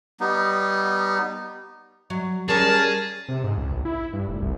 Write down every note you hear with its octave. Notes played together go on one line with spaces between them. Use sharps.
G3 B3 D#4
F#3
G3 C#4 G#4 A#4 C#5 A5
C3
G#2
C#2
A#1
E4
G2
F1
C2